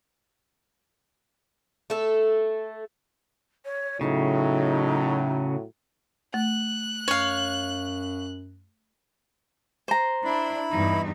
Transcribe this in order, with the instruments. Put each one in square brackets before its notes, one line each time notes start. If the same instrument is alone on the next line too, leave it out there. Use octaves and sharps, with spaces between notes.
[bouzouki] A3 A4
[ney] C#5
[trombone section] A2 F#3 [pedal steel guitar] C#3 [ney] D#4
[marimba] A3 [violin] F#6
[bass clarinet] F#2 [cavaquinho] C#5 F5
[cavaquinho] C5 A#5
[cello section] D4 [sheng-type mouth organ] E4 B5
[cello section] E2 G2 D#4